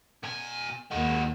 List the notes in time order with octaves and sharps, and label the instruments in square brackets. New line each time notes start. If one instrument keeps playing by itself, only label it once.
[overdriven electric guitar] B2 G#5
[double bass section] D#2 A#3 [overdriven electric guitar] G#3 F#4